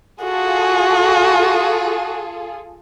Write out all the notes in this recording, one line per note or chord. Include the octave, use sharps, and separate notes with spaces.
F4 F#4 G#4 A4